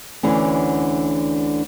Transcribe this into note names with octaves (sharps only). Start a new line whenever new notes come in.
D2 D3 E3 C#4